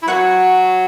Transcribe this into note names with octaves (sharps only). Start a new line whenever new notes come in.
E4
F#3 F#4 C#5 F#5 C#6